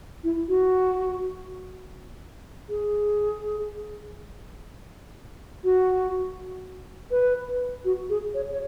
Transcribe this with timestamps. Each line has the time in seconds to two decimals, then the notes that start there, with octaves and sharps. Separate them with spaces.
0.24 E4
0.48 F#4
2.69 G#4
5.64 F#4
7.11 B4
7.85 F#4
8.10 G#4
8.34 C#5
8.51 C#5